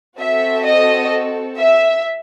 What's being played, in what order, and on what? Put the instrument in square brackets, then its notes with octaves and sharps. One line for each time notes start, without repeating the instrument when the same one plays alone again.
[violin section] C4 F#4 A4 E5
D#5
E5